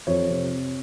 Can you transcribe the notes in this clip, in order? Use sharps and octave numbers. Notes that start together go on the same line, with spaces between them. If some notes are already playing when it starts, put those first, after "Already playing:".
F2 C#5
C3